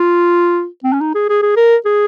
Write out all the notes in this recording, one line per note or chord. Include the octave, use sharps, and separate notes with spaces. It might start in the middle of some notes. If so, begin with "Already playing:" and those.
Already playing: F4
C4
C#4
D#4
G#4
G#4
G#4
A#4
G#4